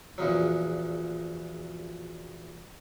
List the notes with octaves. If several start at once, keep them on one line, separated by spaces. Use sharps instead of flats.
A#1 E2 C#3 F#3